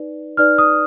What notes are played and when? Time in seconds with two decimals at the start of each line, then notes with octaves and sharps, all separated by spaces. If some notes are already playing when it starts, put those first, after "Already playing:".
Already playing: D#4 B4 D5
0.37 D#4 B4 D5 F6
0.58 D#6